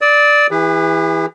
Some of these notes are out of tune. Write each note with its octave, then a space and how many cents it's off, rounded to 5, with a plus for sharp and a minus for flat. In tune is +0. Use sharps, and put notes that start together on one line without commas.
D5 +0 E6 -45
E3 +0 G#4 -45 B4 +0